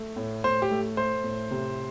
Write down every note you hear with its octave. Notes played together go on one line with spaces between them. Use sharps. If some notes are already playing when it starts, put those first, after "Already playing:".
Already playing: A3
A2
A2 C5
G4
A3
A3 C5
A2
C3